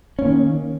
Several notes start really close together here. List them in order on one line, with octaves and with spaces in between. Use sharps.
C#4 A#3 D#3